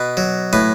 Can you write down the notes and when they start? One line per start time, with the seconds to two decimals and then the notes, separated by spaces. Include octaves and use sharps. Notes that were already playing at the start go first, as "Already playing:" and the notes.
Already playing: B2 B4
0.17 F#3
0.53 A2 B4